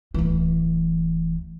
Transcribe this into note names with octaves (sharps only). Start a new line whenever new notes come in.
D1 E3